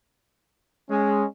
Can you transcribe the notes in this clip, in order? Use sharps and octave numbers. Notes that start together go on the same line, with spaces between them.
G#3 C#4